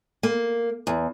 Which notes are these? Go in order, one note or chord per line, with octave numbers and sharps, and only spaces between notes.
A#3
E2